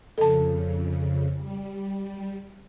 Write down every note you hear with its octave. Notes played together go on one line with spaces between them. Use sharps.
F2 C#3 A4 A5
G3